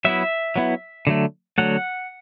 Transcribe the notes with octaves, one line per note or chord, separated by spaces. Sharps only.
F#3 B3 E4 E5
F#3 B3 E4
D3 F#3 A3
D3 F#3 A3 F#5